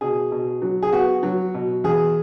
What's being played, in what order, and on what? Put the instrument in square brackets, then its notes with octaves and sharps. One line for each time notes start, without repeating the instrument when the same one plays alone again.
[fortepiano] B2 G#4
B2
F#3
G#4
B3 F#4
F#3
B2
E2 G#4